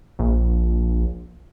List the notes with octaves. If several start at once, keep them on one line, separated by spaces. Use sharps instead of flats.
A#1